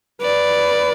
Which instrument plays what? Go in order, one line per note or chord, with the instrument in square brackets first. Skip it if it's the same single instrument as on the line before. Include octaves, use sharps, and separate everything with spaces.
[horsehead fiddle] B4 [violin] D5